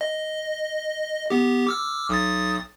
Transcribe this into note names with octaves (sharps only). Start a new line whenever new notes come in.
D#5
B3 G4
D6 E6 F6
B1 D#6 A6